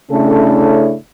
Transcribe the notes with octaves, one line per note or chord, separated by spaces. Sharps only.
C#3 A3 C#4 D4 E4 A4